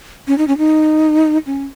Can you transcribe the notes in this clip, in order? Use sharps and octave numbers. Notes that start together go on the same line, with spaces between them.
C#4
D#4
C#4
D#4
C#4